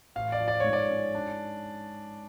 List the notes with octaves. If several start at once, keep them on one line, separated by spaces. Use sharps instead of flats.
A1 F5
D5
F3
D5
G#2 C#5
D5
C#4
D4